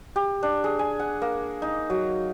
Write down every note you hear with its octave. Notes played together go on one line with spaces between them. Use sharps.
G4
D4
G#4
G#5
F#5
A#3
D#4
F#3